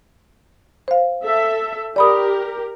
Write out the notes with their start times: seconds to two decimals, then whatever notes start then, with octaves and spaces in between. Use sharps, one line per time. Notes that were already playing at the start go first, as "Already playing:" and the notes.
0.88 C5 F5
1.22 A4 E5
1.96 G4 A#4 D5 B5 D#6